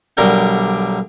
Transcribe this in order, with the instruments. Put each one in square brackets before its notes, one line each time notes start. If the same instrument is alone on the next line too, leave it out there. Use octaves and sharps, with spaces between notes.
[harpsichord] B1 D3 G3 A#4 G5